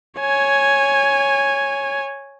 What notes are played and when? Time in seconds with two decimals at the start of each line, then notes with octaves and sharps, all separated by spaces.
0.19 C#5 G#5